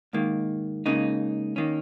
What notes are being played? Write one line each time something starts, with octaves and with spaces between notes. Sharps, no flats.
G#2 D#3 A#3
C#2 C#3 A#3 D#4
D#3 A#3 C#4